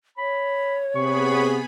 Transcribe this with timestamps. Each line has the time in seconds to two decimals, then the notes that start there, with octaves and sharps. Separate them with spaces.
0.18 C#5 B5
0.95 C3 B3 G#4 B5 C#6